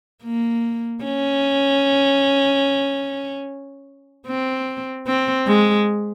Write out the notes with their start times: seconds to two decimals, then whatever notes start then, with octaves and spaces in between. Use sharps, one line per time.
0.23 A#3
1.04 C#4
4.27 C4
5.06 C4
5.47 G#3